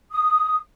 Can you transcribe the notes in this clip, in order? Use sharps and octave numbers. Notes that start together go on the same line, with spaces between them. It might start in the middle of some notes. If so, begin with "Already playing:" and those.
D#6